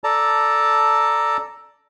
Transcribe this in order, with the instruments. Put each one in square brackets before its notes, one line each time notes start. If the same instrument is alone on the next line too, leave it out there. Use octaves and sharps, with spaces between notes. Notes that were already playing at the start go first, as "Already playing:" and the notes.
[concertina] A4 D5 A5 A#5